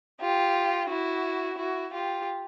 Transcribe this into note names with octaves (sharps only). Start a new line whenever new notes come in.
F4 G4
E4 F#4
E4 F#4
F4 G4